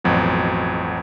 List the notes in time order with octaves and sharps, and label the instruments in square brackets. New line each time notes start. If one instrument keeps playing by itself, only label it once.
[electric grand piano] A1 F2 B2 F#3